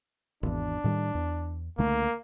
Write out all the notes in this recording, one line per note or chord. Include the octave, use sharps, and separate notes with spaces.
G#1 E2 D4
A2 D#3 G3
E2
C#2 D3 A3 A#3